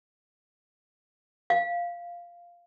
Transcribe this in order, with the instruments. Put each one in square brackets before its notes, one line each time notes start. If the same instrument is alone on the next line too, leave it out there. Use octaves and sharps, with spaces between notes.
[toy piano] F5